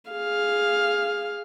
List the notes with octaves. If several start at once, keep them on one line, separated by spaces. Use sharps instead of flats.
G#4 F5